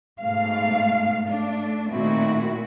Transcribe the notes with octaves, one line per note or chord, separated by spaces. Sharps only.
G#2 B2 A3 F5
A3 D4
A#2 D#3 A3 C4 E4 F#4